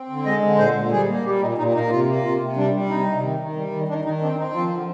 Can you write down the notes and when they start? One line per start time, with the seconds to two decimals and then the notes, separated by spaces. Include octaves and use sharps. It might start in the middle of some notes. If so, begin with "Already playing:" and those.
Already playing: C4
0.10 D3
0.26 G#3 D#5
0.42 D3
0.59 A#2 C5
0.75 A#2
0.92 G3 G#4
1.08 A#3
1.25 G3 G4
1.41 A#2 D#4
1.58 A#2 D#4
1.74 A#3 D#4
1.90 C3 F4
2.07 A#3
2.24 C3 F4
2.40 C3
2.56 G3 D4
2.74 G3
2.89 C3 D#4
3.06 C3
3.23 D#3
3.39 D#3
3.56 G3
3.72 D#3
3.88 D#3 D4
4.05 D#3 D#4
4.22 C4 D4
4.38 C4 D#4
4.55 F3 F4
4.72 D3